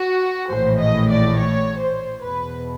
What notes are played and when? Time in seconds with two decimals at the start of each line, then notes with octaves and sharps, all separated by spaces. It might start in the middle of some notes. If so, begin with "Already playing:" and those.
Already playing: F#4
0.52 A#1 A2 E3 C5
0.80 D#5
1.08 D5
1.37 C#5
1.78 C5
2.21 E2 B2 B4